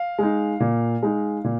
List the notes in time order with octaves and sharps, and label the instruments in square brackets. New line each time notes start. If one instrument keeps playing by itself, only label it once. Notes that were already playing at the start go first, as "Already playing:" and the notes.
Already playing: [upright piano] F5
G#3 D#4
A#2
G#3 D#4
A#2